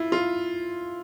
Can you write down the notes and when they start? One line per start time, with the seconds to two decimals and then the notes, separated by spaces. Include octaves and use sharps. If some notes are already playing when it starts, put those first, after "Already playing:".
Already playing: E4 F4
0.12 F4